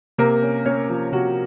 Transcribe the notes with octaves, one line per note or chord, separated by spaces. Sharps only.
C3 A#3 A#4
C#4
A#3 C#4 C#5
F3
C3 F#4